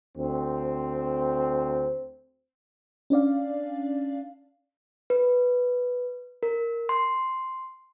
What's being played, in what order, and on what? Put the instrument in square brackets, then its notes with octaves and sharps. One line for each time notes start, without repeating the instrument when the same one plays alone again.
[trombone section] D2 C4
[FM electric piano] C#4 D4 D5 F5
[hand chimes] B4
A#4
C6